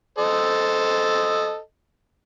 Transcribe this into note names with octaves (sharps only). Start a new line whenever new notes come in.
A4 C5 D#5